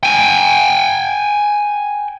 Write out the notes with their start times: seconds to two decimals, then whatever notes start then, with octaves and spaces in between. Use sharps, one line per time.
0.03 G5 G#5